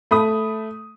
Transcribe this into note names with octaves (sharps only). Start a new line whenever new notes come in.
A3 B5 D#6